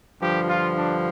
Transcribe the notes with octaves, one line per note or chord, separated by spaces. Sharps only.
G2 D3 F3 G4
F4
D4